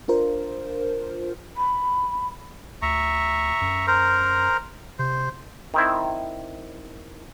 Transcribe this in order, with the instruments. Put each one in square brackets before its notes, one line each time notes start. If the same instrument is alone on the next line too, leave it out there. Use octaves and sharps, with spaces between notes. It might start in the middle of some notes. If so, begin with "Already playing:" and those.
[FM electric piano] D4 F4 A#4 C5
[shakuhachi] B5
[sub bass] D2 [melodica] E5 A#5 C#6
[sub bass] F#2
[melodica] A#4 C5 A#5
[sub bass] C3 [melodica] C5
[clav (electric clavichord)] D#3 C4 E4